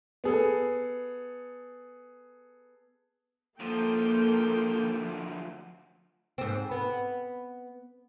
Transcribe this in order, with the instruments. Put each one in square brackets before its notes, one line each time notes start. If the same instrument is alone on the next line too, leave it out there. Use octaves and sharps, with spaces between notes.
[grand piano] B3 G#4 A4
[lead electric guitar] D2 F3 [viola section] A#3 A4 G5
[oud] G#2 C4
B3